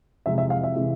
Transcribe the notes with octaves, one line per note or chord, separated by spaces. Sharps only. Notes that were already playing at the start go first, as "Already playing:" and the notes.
F2 C3 E3 G#3 E5
E5
F5
E5
C3 E3 G#3